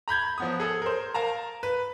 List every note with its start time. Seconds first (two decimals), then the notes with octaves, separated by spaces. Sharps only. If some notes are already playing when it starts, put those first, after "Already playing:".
0.08 A#5 B5 G6 G#6
0.38 F3 B3 D#6
0.60 G#4 A4
0.82 A#4 C5
1.14 A#4 F5 A5 A#5
1.63 B4